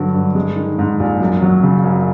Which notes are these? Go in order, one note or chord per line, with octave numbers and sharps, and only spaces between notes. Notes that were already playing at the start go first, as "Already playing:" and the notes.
Already playing: G2 D3 F#3
G2
G#3
D#3
G#2
A#1
F#2
F#3
C#3
F#2